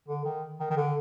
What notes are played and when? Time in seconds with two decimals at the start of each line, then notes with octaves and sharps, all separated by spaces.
0.08 D3
0.25 D#3
0.60 D#3
0.70 D#3
0.77 D3